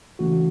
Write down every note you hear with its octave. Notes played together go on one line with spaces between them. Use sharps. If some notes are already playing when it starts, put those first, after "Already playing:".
C#3 E3 A3 C#4 F#4